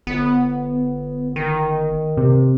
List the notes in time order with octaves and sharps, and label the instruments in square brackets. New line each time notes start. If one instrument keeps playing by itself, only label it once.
[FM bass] G1 [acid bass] B3
[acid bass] D#3
[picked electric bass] C3